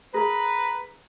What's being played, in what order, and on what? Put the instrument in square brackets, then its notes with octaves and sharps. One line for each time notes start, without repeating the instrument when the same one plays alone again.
[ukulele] G#4 A#4 B5 [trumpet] B4 [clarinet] A#5